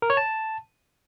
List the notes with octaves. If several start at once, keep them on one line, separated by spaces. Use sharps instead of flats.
A#4
C#5
A5